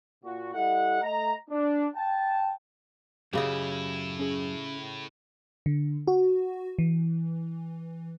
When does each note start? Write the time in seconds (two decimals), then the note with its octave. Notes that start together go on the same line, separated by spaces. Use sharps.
0.23 A#2 F#4
0.53 G3 E4 A4 D#5 F#5
1.02 A3 D#5 A#5
1.50 D4
1.94 G5 A5
3.33 F#2 A2 C#3 E4 G4 D#5
4.19 C#4 G#4
5.66 D3
6.07 F#4
6.79 E3